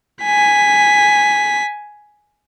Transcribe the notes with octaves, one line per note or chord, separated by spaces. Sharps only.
G#5 B6